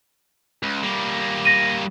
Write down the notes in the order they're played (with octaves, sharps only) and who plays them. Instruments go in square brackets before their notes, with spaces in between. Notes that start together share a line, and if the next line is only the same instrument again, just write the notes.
[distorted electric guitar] C#2
G3 A#3
[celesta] A#6 D#7